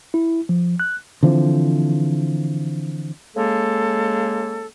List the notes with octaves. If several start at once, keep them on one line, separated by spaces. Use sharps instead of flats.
E4
F3
F#6
D3 E3 F3 C4
C#3 G#3 A#3 A4